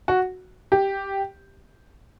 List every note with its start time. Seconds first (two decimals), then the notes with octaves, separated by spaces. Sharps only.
0.08 F#4
0.72 G4